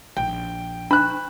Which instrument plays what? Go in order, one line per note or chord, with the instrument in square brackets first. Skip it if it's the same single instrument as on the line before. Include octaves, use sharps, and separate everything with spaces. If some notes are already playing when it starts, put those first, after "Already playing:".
[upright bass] A#1 [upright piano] G5
[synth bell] D4 [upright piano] B5 F#6